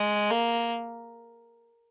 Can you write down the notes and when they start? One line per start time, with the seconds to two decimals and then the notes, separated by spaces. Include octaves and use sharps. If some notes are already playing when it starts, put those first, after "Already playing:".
Already playing: G#3
0.31 A#3